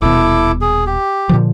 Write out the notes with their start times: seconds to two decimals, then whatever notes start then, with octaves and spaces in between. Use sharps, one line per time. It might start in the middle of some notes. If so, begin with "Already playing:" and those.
0.02 D#1 B2 E4 A4 D6
0.61 G#4
0.87 G4
1.29 A#2 D3 F3